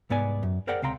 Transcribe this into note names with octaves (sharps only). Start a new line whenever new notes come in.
C2 G#2 B3 D5 G#5
F#2
G#4 A#4 C5 D5 F#5 G5
C#2 C3 F5 G5 A#5 C6